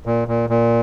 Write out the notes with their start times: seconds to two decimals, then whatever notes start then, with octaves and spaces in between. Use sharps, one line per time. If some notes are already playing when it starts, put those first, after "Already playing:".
0.06 A#2
0.28 A#2
0.50 A#2